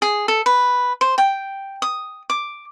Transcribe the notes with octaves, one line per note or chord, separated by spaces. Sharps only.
G#4
A4
B4
C5
G5
D#6
D6